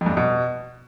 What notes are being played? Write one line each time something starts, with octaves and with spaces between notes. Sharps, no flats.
F2
G2
F2
B2